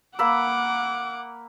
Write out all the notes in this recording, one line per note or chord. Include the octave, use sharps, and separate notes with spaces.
A#3 F#5 B5 D6 E6